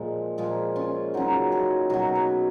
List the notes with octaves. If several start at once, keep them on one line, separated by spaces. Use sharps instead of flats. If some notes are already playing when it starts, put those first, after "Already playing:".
Already playing: A#2 F3 G#3
A#2 F3 G#3 F4 G#4
C#4 F4
C#3 F#3 D#4 F#4
F4 G#4
B2 F#3 F#4 A#4
G#4 B4